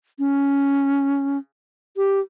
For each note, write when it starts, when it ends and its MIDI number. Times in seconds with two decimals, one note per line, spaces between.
0.19 1.38 61
1.97 2.20 67